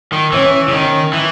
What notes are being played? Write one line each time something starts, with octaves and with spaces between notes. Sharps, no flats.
D#3
E3 C#4
C#3
D#3
E3